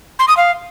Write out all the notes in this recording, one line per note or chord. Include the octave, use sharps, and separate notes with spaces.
C6
D#6
F5